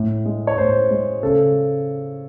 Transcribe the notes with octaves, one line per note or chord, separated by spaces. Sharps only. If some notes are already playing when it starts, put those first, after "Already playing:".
Already playing: A2
G#3
C#5
A2 C5
G#3
C#3 A4